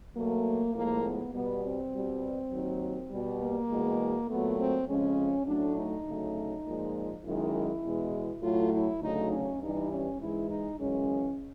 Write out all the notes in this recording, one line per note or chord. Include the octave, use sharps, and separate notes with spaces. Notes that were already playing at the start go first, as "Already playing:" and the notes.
B2 F#3 A3 A#3
A2 F3 G#3 A#3
B3
B2 G3 B3
C4
B2 G3
D#2 D#3 F#3
B2 G3
A#3
E2 B2 G#3
A#2 F#3 A3 B3
C4
F2 C#3 F3 G#3 C#4
A2 F#3 A3 D4
D#4
D2 C#3 F#3 A3
A#2 F3 G#3
F#2 D#3 G#3 E4
E2 B2 G#3
A2 F#3 A3 F4
E4
D2 C#3 F#3 A3 D#4
C#4
G2 E3 G3 D#4
C#4
G#2 E3 G#3 E4
D#4
F#2 C#3 E3 G#3 C#4